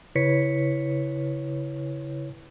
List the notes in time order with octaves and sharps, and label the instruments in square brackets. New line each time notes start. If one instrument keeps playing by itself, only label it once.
[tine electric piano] C#3 E4 B4 C#5 B6 C#7